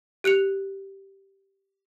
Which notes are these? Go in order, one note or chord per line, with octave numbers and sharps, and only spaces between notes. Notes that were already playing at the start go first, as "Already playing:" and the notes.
G4 F#6 C#7 F7